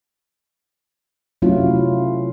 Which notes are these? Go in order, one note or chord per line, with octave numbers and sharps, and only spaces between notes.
C3 F#3 A3 C#4 E4 F4